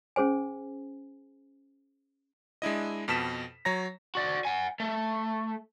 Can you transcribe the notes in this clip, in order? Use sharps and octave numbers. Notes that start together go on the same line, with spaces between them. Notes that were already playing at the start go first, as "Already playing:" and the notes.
C#4 G#4 C5 G#5
G#3 D4 E4 D#5
F2 B2 A5 B6 E7
F#3 C#5 A#5 A#6
F#4 D5
F#5 G#5
A3